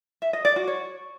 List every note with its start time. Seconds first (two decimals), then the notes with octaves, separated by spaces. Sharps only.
0.22 E5
0.33 D#5
0.45 D5
0.56 F#4
0.67 C#5